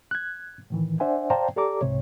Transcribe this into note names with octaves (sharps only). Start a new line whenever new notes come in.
F#6 G#6
A2 D#3 E3
D4 C5 D5 E5 F#5 G#5
C5 D5 F5 G5 A5 A#5
G4 A4 D5 A#5 D6
C2 G#2 C3 C#5